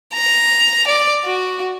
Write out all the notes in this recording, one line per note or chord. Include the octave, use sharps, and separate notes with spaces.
A#5
D5
F#4